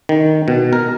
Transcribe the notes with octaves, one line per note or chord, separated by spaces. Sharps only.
D#3
B2
A#4